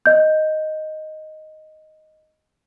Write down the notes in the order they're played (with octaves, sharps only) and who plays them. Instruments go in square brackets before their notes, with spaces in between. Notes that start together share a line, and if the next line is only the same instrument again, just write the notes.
[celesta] D#5 G6